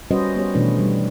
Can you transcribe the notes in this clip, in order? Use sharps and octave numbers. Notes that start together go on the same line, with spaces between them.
G3 C#4 F#4 B4 C5 D#5
G3 B3 G4 C#5
B2 D#3 E3 A3 D4 B4
G3